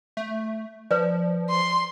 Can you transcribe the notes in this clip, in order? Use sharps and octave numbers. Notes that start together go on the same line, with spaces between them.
A3
F3 B4 D5
C6